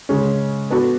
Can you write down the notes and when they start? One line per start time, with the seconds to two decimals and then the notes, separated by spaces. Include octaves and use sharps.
0.09 C#3 G#3 C#4
0.70 B3 D4 F#4 A4